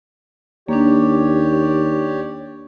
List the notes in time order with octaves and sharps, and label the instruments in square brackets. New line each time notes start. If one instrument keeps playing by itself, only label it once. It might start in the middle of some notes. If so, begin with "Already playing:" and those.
[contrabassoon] D#2 [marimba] A#3 D4 [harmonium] G4 C#5 D5